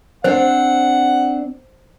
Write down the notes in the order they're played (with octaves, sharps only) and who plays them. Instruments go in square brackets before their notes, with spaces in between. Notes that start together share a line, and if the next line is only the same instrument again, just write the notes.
[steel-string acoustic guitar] C4 D4 [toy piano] C5 [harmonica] F#5